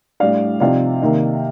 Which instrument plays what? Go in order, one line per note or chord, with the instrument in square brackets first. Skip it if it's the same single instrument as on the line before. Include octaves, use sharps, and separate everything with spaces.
[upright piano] A2 G3 D4 D5 F5
C3 F3 C4 D#4 D5 F5
C3 D#3 A#3 D#4